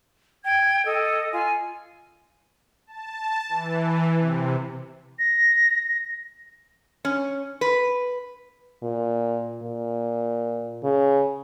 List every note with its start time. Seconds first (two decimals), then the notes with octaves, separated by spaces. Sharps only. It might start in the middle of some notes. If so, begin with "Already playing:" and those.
0.45 G5 G#6
0.85 A4 D#5
1.33 F4 G#5
2.87 A5
3.49 E3
4.18 C3
5.19 A#6
7.05 C#4
7.61 B4
8.83 A#2
9.63 A#2
10.84 C#3